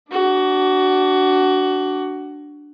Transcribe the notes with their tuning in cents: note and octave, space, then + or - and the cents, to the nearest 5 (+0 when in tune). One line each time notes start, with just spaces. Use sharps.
D4 +0 F#4 +20